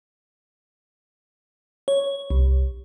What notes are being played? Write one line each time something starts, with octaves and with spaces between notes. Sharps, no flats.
C#5
C2